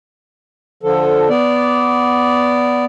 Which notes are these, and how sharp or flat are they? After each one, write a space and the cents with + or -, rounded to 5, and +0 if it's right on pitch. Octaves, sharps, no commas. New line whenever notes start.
D3 +0 F3 +5 A4 +10
B3 +0 D5 -15